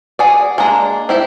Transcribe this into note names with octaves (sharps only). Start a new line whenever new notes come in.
F#4 G#4 D5
G#3 A#3 D4 A#5
C4 E4 G4